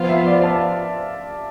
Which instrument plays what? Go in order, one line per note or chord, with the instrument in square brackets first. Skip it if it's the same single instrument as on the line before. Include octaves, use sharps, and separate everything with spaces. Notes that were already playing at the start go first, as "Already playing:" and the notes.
Already playing: [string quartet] F3 B3 F4 C5 [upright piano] F5
[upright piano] E5
D5
A5